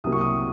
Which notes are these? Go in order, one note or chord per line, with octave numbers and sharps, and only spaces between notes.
C2 C3 F#3 A#3 D#6
C#6
D#6